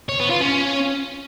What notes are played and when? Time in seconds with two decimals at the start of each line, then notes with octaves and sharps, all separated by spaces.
0.09 C#5
0.19 B3
0.30 F4
0.41 C#4